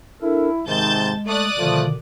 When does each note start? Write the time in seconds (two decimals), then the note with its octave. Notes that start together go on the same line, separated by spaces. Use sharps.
0.22 D4 E4 A4 A#4
0.66 G#2 C3 D#3 G#3 A5 G6 A6
1.26 A3 D5 D#6 F#6
1.57 B2 D3 D#3 F3 A3